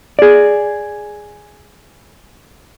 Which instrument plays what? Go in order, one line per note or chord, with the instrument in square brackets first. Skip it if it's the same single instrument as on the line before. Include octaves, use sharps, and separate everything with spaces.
[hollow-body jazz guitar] G#4 D5